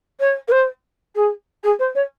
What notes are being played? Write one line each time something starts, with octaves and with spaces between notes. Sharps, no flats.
C#5
A#4
C5
G#4
G#4
C5
C#5